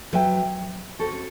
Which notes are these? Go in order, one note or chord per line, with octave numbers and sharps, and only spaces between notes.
F#3 B4 E5 G5
C4 F#4 A4 C5
C#4